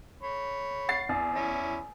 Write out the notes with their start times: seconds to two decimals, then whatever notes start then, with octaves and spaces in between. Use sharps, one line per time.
0.23 C#5 B5
0.89 F#5 A6 C7
1.09 E2
1.35 C#4 E4